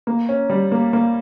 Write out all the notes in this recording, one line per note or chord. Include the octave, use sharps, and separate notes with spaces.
A#3
C#4
G3
A#3
A#3